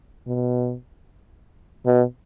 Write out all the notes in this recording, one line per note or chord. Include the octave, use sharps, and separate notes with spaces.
B2
B2